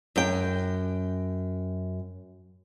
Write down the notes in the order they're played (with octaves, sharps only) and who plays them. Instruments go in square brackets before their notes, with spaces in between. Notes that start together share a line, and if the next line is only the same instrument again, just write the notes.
[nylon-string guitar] F#2 G5